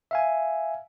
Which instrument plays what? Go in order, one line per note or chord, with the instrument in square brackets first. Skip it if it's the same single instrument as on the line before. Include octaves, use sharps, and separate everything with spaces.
[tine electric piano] E5 F5 G#5